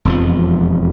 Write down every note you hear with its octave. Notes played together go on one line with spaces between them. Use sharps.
E1 F2 F3